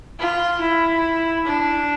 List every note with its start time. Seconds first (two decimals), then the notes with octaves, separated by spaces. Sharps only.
0.19 F4
0.61 E4
1.45 D4